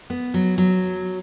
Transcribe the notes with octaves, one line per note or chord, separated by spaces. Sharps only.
B3
F#3
F#3